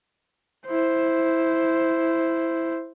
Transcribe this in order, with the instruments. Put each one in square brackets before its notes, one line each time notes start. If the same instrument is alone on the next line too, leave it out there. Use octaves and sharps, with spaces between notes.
[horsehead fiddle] E4 C5